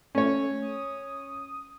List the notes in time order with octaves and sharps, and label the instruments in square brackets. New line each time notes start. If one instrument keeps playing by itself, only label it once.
[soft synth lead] A3 [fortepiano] C#4 C#5
[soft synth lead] D#6